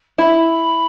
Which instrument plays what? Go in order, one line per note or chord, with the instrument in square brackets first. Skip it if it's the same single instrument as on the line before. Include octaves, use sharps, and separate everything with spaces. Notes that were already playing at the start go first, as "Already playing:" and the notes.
[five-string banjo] E4 [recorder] B5